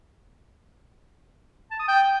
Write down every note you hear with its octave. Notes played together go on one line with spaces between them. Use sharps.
A5
D#6
G5